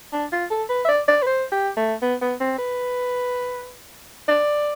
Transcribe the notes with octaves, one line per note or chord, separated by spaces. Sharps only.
D4
F4
A4
B4
E5
D5
D5
B4
C5
G4
A3
B3
B3
C4
B4
D5